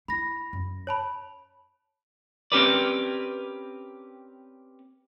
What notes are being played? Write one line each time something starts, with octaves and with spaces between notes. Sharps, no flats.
E4 B5 A#6
F#2
C#5 A5 B5
C4 C#4 G4 A#4 B4 D5